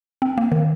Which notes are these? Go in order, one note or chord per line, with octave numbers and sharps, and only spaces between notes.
C4
A#3
D#3